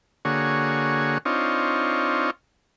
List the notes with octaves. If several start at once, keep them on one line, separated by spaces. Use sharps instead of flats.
D3 A#3 F#4 G#4 C#5
C4 D4 D#4 F4 C#5